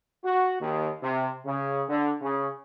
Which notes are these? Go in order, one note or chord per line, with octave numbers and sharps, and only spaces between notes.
F#4
D#2
C3
C#3
D3
C#3